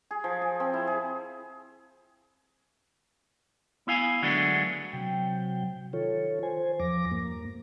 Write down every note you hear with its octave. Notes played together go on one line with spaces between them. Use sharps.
G#4
F3
G#4
C4
E4
G#4
B3 E4 F5 G#5
D3 F#3 G#3 A3 B3 D4
C3 F#3 G5
D#3 F4 A4 C#5
C5 G#5
E2 F3 D6 A#6
G2 A#3